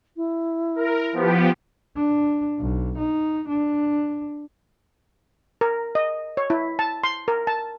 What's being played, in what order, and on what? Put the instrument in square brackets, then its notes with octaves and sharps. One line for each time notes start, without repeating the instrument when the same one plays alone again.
[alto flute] E4
[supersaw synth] A#4
F3 B3 G4
[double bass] D4
B1
D#4
D4
[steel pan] A#4
D#5
C#5
E4
A5
C6
A#4
A5